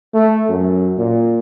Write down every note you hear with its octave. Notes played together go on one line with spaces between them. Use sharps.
A3
F#2
A#2